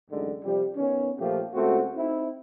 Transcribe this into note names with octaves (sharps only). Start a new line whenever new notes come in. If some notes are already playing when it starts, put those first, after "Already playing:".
A1 F#2 D3 D#3 G#3
C3 F3 G3
D#3 B3 C#4
A#2 F3 A3 F4 G4
C#2 A3 C4 F#4
C4 D#4 E4